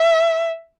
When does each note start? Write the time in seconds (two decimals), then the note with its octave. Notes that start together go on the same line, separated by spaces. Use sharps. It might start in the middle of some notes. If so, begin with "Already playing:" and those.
Already playing: E5